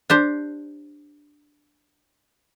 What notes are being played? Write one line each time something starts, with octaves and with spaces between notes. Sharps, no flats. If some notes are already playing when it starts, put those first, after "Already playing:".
D4 G4 C5